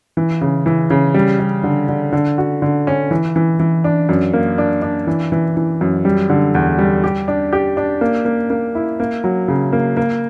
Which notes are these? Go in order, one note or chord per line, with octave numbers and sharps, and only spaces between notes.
E3
C#3
E3
C#3
G3
G3
D3
D3
D3
F#4
D3
C#4
E3
E3
E3
D4
F#2
A#3
D4
D4
E3
E3
E3
F#2
G3
D3
E2
G3
G4
D4
G4
D4
A#3
A#3
A#3
E4
A#3
F#3
C#3
A#3
A#3